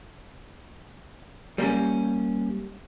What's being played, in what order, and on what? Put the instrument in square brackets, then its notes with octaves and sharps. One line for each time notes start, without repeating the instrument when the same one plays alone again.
[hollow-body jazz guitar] G3 A#3 C4 C#4